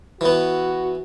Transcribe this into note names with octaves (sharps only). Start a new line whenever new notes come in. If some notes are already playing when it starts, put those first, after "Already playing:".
E3 B3 F#4